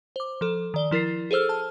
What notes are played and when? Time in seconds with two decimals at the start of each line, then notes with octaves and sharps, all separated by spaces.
0.16 C5 D6
0.41 F3 A4
0.74 D#3 D5 G7
0.91 F3 E4 A#4 A6 C7
1.31 G#4 A4 C5 E6 F6
1.49 A5 F6